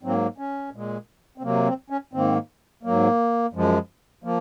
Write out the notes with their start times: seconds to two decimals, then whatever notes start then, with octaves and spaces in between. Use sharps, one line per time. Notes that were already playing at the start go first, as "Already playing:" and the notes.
0.03 G#2 F#3 A#3 C4
0.38 C#4
0.73 A#2 G#3
1.38 C4
1.43 C3 F#3 A#3
1.67 C4
1.90 C#4
2.13 G#2 D#3 A#3 C4
2.83 G#2 F#3 A#3
3.53 F#2 F3 G#3
4.24 F3 A#3